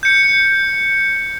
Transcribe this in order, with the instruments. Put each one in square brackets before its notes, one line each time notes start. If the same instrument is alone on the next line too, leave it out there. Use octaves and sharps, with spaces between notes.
[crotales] G6 C#7